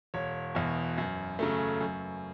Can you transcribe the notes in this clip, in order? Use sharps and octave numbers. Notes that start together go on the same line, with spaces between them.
E1 C#5
E2 B2
F#2
C#3 F#3 A3
F#2